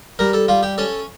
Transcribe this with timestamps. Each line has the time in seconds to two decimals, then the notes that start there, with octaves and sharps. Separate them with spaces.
0.19 G3 A#4
0.33 A4
0.48 G3 F4
0.63 G4
0.78 C#4 A4